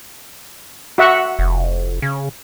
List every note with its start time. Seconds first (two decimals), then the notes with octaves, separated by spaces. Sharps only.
0.98 F#4 E5 F#5
1.39 F1
2.02 C#3